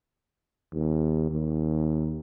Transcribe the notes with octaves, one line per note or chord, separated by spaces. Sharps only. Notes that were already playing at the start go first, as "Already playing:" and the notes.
D#2
D#2